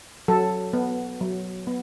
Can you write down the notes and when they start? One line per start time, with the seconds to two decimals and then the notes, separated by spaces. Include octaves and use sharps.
0.28 F#3 A4
0.73 B3
1.21 F#3
1.67 B3